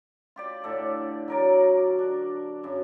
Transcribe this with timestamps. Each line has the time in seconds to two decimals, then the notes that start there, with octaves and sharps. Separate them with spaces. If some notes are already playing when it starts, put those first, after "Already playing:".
0.36 F4 G4 D5
0.64 A2 D3 A4
1.28 F#3 A#4 D5
1.99 D4
2.63 F#2 C#3